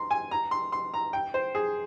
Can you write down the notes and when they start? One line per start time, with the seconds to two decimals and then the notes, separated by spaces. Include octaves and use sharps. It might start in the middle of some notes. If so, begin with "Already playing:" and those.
Already playing: A#5 C6
0.11 G#5
0.31 A#5
0.51 C6
0.72 C6
0.94 A#5
1.13 G5
1.34 C5
1.55 G#4